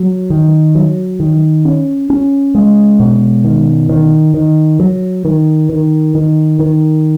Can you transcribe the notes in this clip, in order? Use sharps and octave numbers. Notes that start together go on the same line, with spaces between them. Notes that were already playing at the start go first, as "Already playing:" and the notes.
Already playing: F#3
D#3
F#3
D#3
C#4
C#4
G#3
B2
D#3
D#3
D#3
F#3
D#3
D#3
D#3
D#3